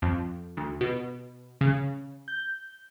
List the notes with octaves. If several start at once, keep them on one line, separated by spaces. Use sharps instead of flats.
F2
D2
B2
C#3
G6